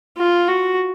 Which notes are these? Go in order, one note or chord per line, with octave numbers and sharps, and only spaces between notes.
F4
F#4